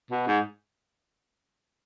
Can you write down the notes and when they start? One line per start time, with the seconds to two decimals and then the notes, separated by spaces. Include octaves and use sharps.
0.11 B2
0.27 G#2